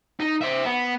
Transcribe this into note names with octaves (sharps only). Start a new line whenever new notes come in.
D#4
C5 E5
B3